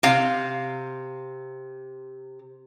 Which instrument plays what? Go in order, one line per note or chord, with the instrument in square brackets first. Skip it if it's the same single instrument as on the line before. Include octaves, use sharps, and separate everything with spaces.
[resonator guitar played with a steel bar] C3 F5